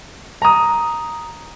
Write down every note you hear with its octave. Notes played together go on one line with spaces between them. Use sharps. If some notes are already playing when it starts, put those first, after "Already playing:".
A#5 D#6